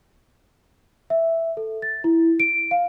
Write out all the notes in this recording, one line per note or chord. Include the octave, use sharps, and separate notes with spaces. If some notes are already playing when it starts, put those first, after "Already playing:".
E5
A4
A6
E4
D7
F5